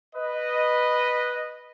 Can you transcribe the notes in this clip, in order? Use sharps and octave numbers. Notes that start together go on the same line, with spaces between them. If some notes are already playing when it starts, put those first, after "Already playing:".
B4 D#5